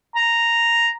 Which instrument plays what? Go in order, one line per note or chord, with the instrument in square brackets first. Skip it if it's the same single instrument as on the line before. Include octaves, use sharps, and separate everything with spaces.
[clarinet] A#5